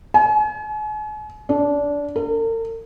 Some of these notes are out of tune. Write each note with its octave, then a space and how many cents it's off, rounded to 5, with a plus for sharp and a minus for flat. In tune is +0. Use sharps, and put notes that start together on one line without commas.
G#5 +40
D4 -20
A#4 -45